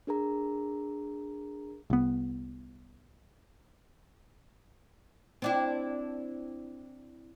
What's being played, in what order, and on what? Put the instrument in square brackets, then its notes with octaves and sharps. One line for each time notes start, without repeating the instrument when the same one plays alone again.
[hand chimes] D4 G#4 A#4 A#5
[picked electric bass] C2 B3
[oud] C4 D4 E4